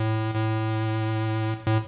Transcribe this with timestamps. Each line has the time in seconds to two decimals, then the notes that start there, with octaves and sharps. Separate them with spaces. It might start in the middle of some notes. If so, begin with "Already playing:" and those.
Already playing: A2
0.35 A2
1.67 A2